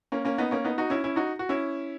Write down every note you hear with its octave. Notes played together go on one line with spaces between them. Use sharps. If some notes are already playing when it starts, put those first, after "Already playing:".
A#3 C#4
A#3 C#4
B3 D#4
A#3 C#4
B3 D#4
D#4 F#4
C#4 E4
C#4 E4
D#4 F#4
F#4
C#4 E4